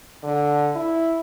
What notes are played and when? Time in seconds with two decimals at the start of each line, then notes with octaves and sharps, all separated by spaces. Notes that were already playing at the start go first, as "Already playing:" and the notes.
0.23 D3
0.75 E4